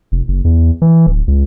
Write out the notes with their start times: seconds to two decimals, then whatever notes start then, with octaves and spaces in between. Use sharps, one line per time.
0.12 F1
0.28 F#1
0.45 E2
0.82 E3
1.07 D1
1.27 C#2